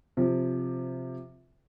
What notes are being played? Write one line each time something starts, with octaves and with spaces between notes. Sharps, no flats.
C3 F3